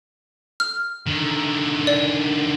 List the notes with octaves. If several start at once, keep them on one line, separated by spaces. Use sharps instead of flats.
F6
D3 D#3
D5